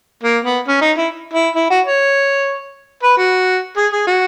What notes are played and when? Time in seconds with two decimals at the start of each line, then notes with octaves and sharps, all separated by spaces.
0.23 A#3
0.44 B3
0.68 C#4
0.81 D#4
0.97 E4
1.33 E4
1.56 E4
1.70 F#4
1.85 C#5
3.03 B4
3.18 F#4
3.77 G#4
3.92 G#4
4.07 F#4